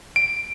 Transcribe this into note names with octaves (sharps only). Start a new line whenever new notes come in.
D7